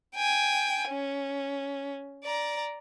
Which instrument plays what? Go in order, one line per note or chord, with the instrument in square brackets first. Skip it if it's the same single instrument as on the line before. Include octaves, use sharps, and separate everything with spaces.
[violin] G5 G#5
C#4
D5 A#5